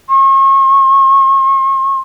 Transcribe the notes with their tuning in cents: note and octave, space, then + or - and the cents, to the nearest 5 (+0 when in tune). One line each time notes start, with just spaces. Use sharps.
C#6 -40